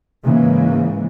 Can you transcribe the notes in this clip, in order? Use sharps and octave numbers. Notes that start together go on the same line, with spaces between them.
G#2 C#3 E3 G#3 A#3